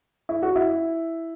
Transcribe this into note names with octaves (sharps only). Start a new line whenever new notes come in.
E4
F#4
E4